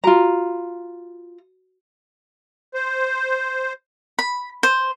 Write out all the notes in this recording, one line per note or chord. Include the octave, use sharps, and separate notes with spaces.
F4 F#4 G#5 A#5 B5
C5
B5
C5